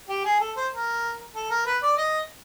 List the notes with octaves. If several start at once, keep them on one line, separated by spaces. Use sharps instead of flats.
G4
G#4
A4
C5
A#4
A4
A#4
B4
D5
D#5